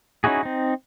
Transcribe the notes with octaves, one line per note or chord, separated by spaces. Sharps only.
C#4 D#4 E4 F#4 G#4
C4 D#4